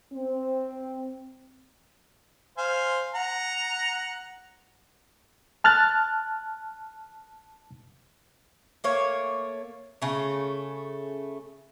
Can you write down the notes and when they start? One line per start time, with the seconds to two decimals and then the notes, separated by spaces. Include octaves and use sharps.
0.13 C4
2.58 C5 F5 G#5
3.15 F#5 A#5
5.64 A5 F6 F#6 A6
8.84 A3 A#3 C#5
10.02 C#3 A3